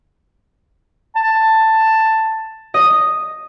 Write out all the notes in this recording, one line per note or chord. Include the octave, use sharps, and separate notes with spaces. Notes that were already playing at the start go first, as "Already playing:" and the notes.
A5
D#5